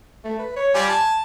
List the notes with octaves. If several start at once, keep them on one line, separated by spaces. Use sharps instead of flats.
A3
B4
C#5
G3 F4 D5 G#5
A5